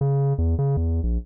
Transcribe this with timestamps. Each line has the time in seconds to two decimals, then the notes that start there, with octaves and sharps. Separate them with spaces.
0.01 C#3
0.38 E2
0.59 C#3
0.77 E2
1.03 A#1